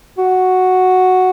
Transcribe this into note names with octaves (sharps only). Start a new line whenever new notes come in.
F#4